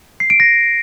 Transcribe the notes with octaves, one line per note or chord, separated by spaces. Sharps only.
C7
D7
A#6